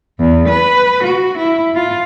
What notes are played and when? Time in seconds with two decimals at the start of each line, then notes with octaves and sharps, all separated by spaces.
0.20 E2
0.49 B4
1.04 F#4
1.38 E4
1.75 F4